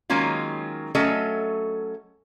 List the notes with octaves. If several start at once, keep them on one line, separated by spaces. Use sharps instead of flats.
D#3 F#3 G#3 A#3 C#4 F4
F#3 A3 C#4 A4 D#5